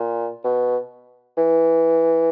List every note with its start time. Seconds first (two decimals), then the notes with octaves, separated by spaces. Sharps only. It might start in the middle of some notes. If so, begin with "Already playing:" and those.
Already playing: A#2
0.44 B2
1.38 E3